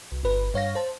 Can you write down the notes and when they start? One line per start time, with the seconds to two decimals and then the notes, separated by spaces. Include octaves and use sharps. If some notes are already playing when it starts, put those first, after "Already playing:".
0.12 C2
0.23 G1 B4
0.54 G2 C#5 F5 A#6
0.75 C5 A5